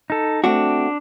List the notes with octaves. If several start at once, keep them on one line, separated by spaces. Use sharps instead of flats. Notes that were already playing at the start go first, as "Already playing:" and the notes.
D#4 A4
A3 C4 D4 F#4